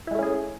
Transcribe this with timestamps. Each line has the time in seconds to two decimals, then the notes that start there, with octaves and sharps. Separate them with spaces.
0.07 E4
0.11 G#3
0.15 A3
0.19 C#4
0.23 G#4